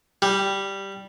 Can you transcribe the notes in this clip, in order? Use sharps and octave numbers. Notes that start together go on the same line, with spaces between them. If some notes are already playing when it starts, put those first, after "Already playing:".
G3